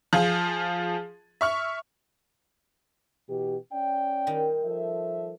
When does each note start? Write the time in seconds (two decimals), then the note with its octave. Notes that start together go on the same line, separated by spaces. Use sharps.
0.13 F3 F4 G#4
1.41 E5 C#6 F6
3.28 B2 E3 G4
3.72 C#4 D5 G5
4.27 D#3 G3
4.65 F3 A4 E5